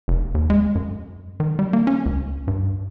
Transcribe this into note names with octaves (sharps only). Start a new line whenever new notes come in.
F1
D#2
G#3
F#2
D#3
G3
A#3
C#4
C#2
G2